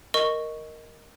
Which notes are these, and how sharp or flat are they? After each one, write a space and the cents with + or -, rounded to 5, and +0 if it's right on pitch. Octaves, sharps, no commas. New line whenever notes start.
A#4 +0 D#5 +0 C#6 +0